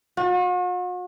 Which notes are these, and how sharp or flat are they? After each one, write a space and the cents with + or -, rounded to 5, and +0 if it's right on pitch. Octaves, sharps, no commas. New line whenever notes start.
F#4 -45